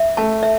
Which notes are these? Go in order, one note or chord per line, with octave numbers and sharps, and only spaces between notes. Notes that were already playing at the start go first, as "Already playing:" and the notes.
Already playing: E5
A3 A5
E5